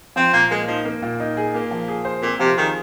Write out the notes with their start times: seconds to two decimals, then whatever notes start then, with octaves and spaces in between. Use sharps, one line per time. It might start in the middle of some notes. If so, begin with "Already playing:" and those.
0.16 F3 C4
0.33 A#2 A#3
0.50 G#3 A#3
0.68 F3 D#4
0.85 A#3
1.02 A#2
1.20 D#4
1.37 G#4
1.53 A#2 A#3
1.71 F3
1.88 G#4
2.05 C5
2.22 A#2 C4
2.39 C3 F3
2.57 D#3 G#4